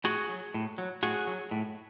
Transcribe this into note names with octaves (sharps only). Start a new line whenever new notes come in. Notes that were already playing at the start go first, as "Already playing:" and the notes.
A2 F#4 G#4
F#3
A2
F#3
A2 F#4 G#4
F#3
A2